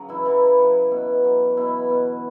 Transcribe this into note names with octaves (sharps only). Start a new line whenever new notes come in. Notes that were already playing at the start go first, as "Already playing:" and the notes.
Already playing: C#3 F#3
E3 E4
E3 F#3 E4
F#3
B2
F#3
B2 E3 E4
B2